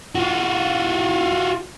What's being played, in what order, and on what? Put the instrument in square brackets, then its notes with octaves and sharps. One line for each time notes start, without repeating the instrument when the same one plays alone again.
[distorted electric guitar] F4 F#4